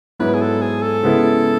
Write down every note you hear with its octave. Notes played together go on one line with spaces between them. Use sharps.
G#2 F#3 B3 E4 B4
G#4
A4
G#4
A4
C#3 G#3 B3 E4